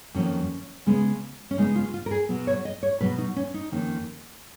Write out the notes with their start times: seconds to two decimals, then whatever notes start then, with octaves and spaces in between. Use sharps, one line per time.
0.14 F2 D#3 F#3 A#3 C#4
0.86 C#3 G#3 B3
1.51 C#4
1.58 C#3 G#3 B3 D#4
1.75 F4
1.94 F4
2.06 A#4
2.11 G#4
2.29 B2 F#3 B3
2.47 C#5
2.65 D#5
2.83 C#5
3.00 B2 F#3 B3 B4
3.18 D#4
3.36 C#4
3.54 D#4
3.72 F2 D#3 A#3 C#4